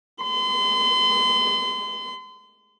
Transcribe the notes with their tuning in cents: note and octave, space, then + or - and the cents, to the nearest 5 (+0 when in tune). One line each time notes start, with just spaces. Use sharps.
C6 -40